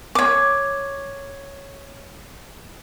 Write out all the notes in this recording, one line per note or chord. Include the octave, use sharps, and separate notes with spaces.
C#5 D6